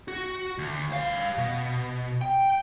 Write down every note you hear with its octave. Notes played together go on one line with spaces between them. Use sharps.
F#4
D2
G3 F5
B2
G5